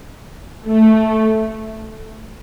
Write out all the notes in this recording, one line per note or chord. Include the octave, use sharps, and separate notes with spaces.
A3